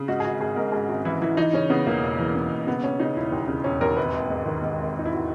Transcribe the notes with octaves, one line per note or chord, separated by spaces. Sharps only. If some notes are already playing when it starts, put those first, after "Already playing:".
Already playing: C#3
G#2 F#4
G#4
G#1 F#4
G#1 G#4
G#2 A#4
G#2 G#4
G#1 F#4
E3 E4
E3 E4
E3 D#4
C#3 C#4
C#3 B3
E1 A#3
E1
E3
C#3
E1
C#3 B3
C#3 C#4
C#3 D#4
E1 E4
D#2
C#3
E1 C#4
D#2 A#4
G#1 B4
G#1
G#2
D#3
G#2
G#1
G#1 D#4
E4
F#4